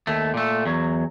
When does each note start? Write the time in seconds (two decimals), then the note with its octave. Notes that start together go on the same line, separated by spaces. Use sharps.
0.07 D#2 A3
0.34 A#2 A3
0.66 E2 F#3